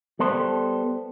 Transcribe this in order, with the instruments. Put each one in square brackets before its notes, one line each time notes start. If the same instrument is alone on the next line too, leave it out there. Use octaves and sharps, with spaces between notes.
[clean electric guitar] G3 B3 A4 C5